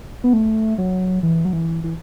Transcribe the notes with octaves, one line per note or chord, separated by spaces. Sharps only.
B3
A3
F#3
E3
F#3
E3
E3